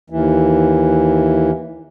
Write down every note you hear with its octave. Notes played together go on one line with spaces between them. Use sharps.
D#2 E3